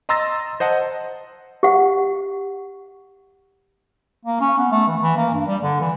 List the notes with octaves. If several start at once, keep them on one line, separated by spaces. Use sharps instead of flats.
D#5 A#5 C6 E6 A6 A#6
C5 D#5 F#5 A5
G4 F#5
A#3
C#4
B3
A3
E3
E3
A#3
G2
G3
D3
E3